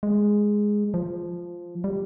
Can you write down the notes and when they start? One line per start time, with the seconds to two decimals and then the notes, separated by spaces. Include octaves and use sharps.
0.03 G#3
0.94 F3
1.84 G3